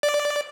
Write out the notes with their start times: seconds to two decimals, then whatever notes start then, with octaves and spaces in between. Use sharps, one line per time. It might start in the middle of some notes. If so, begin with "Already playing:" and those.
0.03 D5